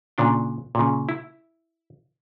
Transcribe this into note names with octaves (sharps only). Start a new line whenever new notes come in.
A#2 C#3 D4 G5
A#2 C#3
E4